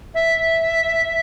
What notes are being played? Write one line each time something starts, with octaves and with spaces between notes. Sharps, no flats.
E5